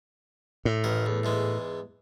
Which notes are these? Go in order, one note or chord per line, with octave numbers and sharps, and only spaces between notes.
A2
A1 D#3 A#4
E2
E2 G#2 G#3